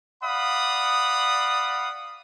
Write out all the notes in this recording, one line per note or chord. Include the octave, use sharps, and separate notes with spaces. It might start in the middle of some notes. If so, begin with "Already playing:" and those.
D5 F5 F#5 B5 D#6